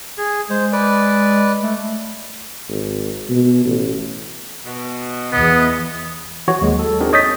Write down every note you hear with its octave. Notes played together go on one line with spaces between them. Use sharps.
G#4
G#3 C5
B4 D5
A3
G#1
B2
A1
B2
E2 B3 D#5
E3 F#4 C#5
D#2 F#3 G#3
A4
C4 D4 D#4 F#4 G#4 A#4
C#5 D#5 D#6 G6 A6 B6